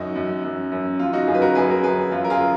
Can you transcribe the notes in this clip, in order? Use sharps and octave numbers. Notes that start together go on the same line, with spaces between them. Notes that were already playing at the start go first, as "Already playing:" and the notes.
Already playing: F#2 D#4 F#4
F#2
F#2
F#2
F#2 F4
D#4 F#4
F#2 F4 G#4
B4
F#4 A#4
F#2 G#4 B4
F#4 A#4
F#2 G#4 B4
F#2 F4
A#4
F4 G#4